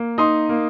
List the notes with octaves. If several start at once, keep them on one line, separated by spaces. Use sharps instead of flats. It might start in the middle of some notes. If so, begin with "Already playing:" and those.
Already playing: A#3
D#4 C6 D#6
A#3